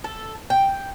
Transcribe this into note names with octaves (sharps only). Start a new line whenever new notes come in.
A4
G5